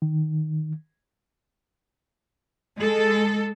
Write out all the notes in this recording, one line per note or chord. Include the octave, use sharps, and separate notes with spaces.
D#3
G#3 A4